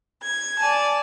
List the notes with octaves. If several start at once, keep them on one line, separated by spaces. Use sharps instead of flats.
G#6
D5 G#5 A5